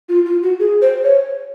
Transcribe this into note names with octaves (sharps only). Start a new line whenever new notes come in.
F4
F4
F#4
G#4
C5
C#5